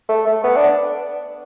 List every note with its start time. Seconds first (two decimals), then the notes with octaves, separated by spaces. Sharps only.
0.09 A3
0.27 A3
0.44 B3
0.57 D4